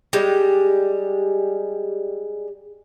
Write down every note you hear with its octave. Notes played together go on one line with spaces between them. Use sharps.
G3 G#3